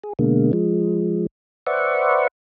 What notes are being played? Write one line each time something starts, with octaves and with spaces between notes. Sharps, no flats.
G#4
B2 D3 G#3 A#3
F3 G#3
B4 C5 D5 E5 F#5 C#6